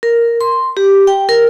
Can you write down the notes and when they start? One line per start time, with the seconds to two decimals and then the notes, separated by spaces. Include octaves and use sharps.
0.03 A#4
0.41 C6
0.77 G4
1.07 G5
1.29 A#4